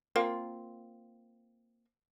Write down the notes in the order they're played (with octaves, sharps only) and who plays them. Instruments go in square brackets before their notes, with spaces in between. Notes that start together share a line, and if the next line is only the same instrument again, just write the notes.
[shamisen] A#3 C4 F4